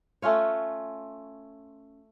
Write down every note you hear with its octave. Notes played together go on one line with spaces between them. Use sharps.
A3 C#4 F4 C#5